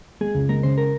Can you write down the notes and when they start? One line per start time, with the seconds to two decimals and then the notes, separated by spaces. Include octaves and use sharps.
0.21 G#3 G#4
0.35 C#2
0.49 G#3 A#4
0.63 C#3 C5
0.78 A#4